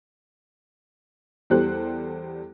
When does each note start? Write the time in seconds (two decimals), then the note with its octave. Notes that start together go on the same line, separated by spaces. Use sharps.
1.50 E2 G3 G4 A4 C5 F#6